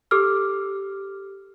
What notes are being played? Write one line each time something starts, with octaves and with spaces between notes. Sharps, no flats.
G4 A4 D6 E6 F6